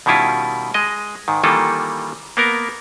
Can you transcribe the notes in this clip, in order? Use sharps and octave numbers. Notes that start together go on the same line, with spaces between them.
B2 D#3 G3 C#4 E4 F4
G#3 D#5
G#2 D#3
D#3 E3 G3 A#3 F4 A4
A#3 B3 A#4